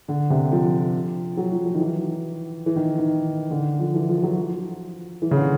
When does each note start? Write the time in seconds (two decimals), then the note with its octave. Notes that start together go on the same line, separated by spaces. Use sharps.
0.08 D3
0.30 C3
0.52 F3
1.37 F#3
1.51 F3
1.66 F3
1.74 D#3
1.80 E3
2.66 E3
2.76 D#3
2.98 D#3
3.51 D3
3.80 F3
3.94 E3
4.09 F3
4.23 F#3
4.36 F3
5.22 E3
5.31 C#3
5.36 D3